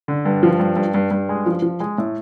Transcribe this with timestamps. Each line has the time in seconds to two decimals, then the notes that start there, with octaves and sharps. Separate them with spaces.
0.08 D3
0.25 G2
0.43 F3
0.59 G2
0.76 G2
0.94 G2
1.11 G2
1.29 G#3
1.46 F3
1.62 F3
1.80 G#3
1.98 A2